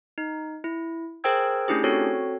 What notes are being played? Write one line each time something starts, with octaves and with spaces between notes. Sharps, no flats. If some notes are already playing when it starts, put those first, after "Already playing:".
D#4
E4
G#4 A#4 C5 G5 E6 G#6
A3 C#4 D4 E4 G4 G#4
C4 F#4 A4 C#5